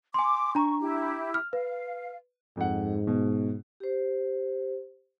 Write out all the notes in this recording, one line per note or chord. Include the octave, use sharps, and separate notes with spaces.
G#5 C6 D6
D4 A#5 C#6
E4 G4
F6
B4 F5
F2 G#2 F#5
B2
G4 C5